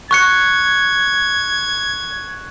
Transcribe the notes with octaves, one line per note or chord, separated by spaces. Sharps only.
C#6 F#6 G#6 C#7